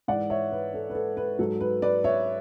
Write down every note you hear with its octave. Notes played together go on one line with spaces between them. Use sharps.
G#2 E3 D5 F#5
C#5 E5
B4
A4
B4
A4
B4
G#2 F#3 A4
B4
B4 D5
C#5 E5